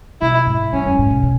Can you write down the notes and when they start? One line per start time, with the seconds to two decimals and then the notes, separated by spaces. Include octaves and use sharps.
0.22 B2 E4
0.47 G#2
0.73 F#2 C#4
0.85 F#2
0.98 G#2
1.10 B2
1.23 B2